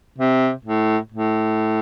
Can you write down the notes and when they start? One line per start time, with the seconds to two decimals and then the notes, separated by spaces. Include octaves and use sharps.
0.18 C3
0.65 A2
1.12 A2